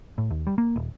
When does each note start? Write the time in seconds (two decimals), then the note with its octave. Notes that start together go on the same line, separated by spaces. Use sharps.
0.18 A2
0.31 D#2
0.47 G3
0.58 A#3
0.76 D#1